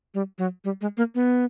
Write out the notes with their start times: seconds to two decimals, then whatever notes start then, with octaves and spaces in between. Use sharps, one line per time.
0.14 G3
0.38 F#3
0.64 G3
0.81 G#3
0.97 A#3
1.15 B3